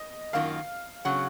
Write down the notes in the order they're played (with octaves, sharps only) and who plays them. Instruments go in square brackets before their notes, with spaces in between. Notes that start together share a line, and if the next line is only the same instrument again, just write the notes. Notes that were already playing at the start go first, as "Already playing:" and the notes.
Already playing: [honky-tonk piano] D#5
[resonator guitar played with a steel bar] F#2 D#3 A#3 F4 [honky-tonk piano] F5
[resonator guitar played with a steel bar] C#3 F#3 [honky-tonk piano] F#5